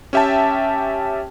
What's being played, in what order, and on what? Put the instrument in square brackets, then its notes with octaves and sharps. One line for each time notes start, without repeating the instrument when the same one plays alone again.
[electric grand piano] C#4 G4 E5 G5 A5